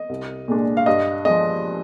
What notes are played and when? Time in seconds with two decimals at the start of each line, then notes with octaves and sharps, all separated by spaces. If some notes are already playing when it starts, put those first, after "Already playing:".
Already playing: D#5
0.09 C2
0.48 A#2 G#3 D4
0.77 F5
0.86 G2 D#5
1.25 F3 G#3 D#5